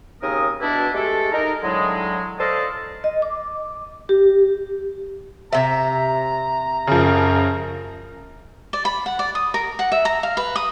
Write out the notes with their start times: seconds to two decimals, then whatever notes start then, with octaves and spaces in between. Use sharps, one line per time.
0.22 D#2 C#3 C4 A#4 D#6
0.60 B2 D4 E4
0.94 G#3 A3 G4 A4
1.32 D#4 A#4
1.62 A2 D3 F#3 G#3
2.39 A4 C5 D5 D#5 F5 A5
3.04 D#5
3.22 D6
4.09 G4
5.53 C3 E5 A#5
6.87 F#2 C#3 F3
8.73 D5
8.85 B5
9.06 F#5
9.19 D5
9.35 D#6
9.54 A#4
9.79 F#5
9.92 E5
10.05 A#5
10.23 F5
10.37 B4
10.56 D#6